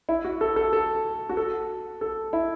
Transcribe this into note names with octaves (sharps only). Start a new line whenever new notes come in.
E4
F#4
A4
A4
A4
F#4
A4
A4
E4